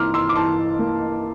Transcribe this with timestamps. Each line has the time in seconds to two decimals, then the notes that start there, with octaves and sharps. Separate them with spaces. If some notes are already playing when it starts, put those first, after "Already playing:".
Already playing: E3 A#3 A#5 C6 D6 F6
0.14 C6 E6
0.29 D6
0.36 E3 A5 C6
0.79 A#3